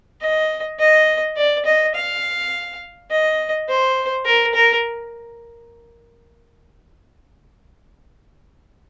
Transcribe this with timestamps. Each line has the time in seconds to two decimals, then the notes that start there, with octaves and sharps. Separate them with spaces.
0.21 D#5
0.79 D#5
1.37 D5
1.65 D#5
1.95 F5
3.11 D#5
3.68 C5
4.25 A#4
4.55 A#4